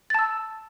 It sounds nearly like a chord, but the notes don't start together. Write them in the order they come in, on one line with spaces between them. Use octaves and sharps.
A6 A5 E6